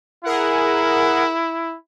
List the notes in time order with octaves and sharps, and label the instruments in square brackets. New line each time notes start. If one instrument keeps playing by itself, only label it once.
[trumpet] E4 [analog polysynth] G#4 A#4 F#5